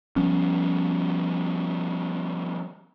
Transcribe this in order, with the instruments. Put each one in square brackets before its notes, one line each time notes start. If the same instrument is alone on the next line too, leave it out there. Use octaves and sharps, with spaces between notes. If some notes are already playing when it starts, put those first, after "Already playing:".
[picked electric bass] F3 G3 B3 C#4